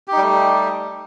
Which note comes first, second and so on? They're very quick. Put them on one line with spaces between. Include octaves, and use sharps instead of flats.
G4 D#4 G3 A3